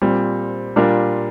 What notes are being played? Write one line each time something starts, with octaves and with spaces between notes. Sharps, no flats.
A#2 G3 C4
A#2 G3 D4 F4 A#4